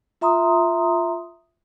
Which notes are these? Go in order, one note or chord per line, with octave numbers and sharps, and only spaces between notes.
F4 E5 A#5 C6 D#6